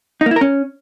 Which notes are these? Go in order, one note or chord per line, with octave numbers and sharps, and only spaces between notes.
D#4
A#3
E4
A#4
C#4